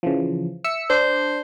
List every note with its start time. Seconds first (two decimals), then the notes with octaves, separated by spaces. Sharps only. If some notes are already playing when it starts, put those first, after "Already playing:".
0.03 C#3 E3 F3
0.64 E5 E6 C#7
0.90 D4 C5